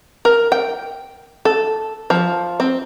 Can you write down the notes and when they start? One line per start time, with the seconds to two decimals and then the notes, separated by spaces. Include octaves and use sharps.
0.25 A#4
0.52 G5
1.45 A4
2.10 F3
2.60 C4